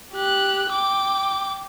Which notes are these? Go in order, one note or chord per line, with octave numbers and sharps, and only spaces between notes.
G4 F#6
G5 D6